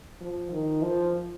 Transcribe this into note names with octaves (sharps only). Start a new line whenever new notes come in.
F3
D#3
F3